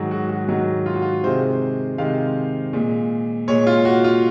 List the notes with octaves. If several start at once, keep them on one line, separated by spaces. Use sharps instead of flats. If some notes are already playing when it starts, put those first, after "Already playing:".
Already playing: G#2 D#3 F#3 F#4 G#4
F#4
F#4
G#2 D#3 F#3 F#4
F4
F#4
F4
C3 D#3 G#3 C5
C3 D#3 G#3 F5
A#2 G#3
A#2 G#3 C#5
F4
F#4
F4